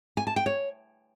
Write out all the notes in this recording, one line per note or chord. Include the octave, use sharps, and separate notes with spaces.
G#5
A5
G5
C#5